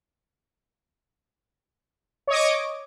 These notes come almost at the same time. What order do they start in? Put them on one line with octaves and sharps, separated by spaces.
C#5 D#5 D6